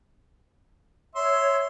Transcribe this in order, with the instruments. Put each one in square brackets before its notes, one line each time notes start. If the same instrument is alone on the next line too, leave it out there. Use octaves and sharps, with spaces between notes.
[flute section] C#5 [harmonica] E5 C6